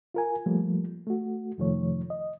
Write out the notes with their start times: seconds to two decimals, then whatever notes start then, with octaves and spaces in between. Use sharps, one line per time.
0.14 F4 A#4 G#5
0.46 F3 G3 A3 A#3
1.07 A3 F#4
1.58 F2 C3 D#3 F3 A3 C#5
2.10 D#5